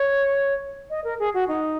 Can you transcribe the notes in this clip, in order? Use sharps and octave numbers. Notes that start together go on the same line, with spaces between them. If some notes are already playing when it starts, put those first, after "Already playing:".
Already playing: C#5
D#5
A#4
G#4
F#4
D#4